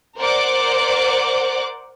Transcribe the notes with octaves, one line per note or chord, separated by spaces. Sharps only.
A#4 C5 D5 F#5 D6